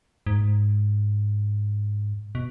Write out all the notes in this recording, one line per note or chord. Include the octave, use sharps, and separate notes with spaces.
G#2
B2